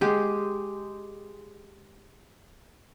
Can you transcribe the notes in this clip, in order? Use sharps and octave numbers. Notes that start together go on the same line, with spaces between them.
G#3 G4